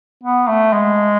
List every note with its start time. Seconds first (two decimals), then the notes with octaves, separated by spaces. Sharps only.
0.23 B3
0.48 A3
0.73 G#3